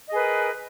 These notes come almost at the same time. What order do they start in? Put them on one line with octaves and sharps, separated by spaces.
D#5 G#4 B4 A#4